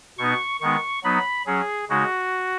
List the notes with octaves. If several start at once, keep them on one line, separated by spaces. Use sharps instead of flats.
B2 B3 D#4 C#6
D#3 G#3 B3 D#4 C#6
F#3 B3 D#4 B5
F#3 C#4 G#4
C#3 G#3 D#4 F#4